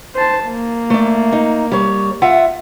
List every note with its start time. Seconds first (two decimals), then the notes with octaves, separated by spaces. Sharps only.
0.15 C5 A5
0.46 A#3
0.90 A3 D5
1.32 D#4
1.71 G3 C#5
2.22 F4 E5 F#5